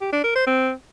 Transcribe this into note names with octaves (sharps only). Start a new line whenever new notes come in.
G4
D4
A#4
C5
C4